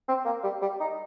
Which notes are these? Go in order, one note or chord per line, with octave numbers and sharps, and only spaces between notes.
C4
A#3
G3
G3
D#4